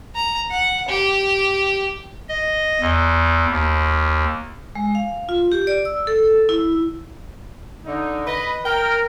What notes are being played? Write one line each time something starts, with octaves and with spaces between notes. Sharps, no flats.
A#5
F#5
G4
D#5
E2
D#2
G#3
F5
F4
G4
D5
E6
A4
E4
D3 D#4
B4 D#5 B5
A#4 G5